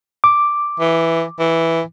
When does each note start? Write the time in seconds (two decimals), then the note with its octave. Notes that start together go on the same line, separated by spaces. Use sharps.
0.24 D6
0.80 E3
1.39 E3